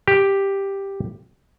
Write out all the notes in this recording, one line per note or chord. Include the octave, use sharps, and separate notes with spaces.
G4